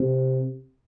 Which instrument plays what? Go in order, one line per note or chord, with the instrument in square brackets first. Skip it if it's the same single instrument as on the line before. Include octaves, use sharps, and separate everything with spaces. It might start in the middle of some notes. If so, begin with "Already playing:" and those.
Already playing: [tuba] C3